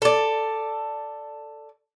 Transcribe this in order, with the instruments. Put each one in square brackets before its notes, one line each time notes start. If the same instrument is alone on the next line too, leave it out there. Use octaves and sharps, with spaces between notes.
[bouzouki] A4 D5